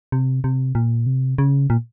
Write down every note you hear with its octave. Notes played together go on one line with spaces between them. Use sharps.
C3
C3
A#2
C3
C#3
A#2